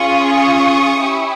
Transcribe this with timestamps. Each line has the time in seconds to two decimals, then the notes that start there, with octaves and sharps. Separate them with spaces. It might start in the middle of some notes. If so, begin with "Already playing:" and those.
Already playing: C#4 F4 G#4 C#6 D#6
0.98 C#4 E4 G4